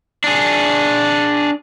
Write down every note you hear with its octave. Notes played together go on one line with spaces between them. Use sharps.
D4 G#4